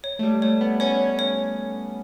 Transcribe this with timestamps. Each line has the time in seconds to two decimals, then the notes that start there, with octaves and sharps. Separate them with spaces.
0.04 C#5
0.19 A3
0.23 G3
0.42 A3 C#5
0.61 B3
0.80 C#4 C#5
1.19 C#5